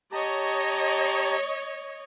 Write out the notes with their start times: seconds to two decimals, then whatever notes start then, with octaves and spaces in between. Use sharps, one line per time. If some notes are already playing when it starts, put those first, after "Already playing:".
0.12 G4 C#5 D#5 A5 A#5